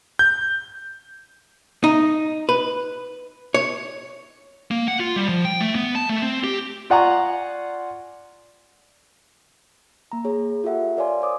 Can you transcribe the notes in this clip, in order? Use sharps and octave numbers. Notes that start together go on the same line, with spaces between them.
G6
D#4
B4
C#5
A#3
F#5
F4
G3
F3
G5
A3
B3
A5
A3
C4
G4
F4 D5 F#5 G#5 A#5 C#6
A#3 A#5
G#4 C#5
F4 G4 A4 E5 F#5
A#4 C#5 D5 F5 G#5 C6
C5 C#5 D6 D#6